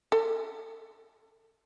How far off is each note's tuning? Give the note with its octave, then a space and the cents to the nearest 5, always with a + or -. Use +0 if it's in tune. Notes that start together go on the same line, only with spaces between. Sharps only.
A4 +45